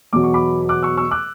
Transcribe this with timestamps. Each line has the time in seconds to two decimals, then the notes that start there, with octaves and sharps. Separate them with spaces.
0.13 E2 B2 F#3 D6
0.24 C#6
0.34 B5 D6
0.69 D6 F#6
0.83 C#6 E6
0.97 C#6 E6
1.11 D6 F#6